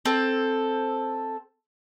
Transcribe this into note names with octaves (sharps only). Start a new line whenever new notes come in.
C4 A4